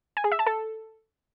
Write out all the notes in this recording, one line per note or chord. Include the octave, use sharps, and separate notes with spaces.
G#5
G#4
E5
A5
A4